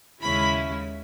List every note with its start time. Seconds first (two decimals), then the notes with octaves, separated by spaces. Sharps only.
0.22 D#2 C#3 G#3 C#4 E4 B5